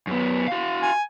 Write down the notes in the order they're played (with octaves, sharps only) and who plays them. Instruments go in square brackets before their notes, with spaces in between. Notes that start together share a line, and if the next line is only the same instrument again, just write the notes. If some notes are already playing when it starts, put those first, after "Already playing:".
[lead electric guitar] F#2 B3
F#4 F5
[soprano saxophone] G#5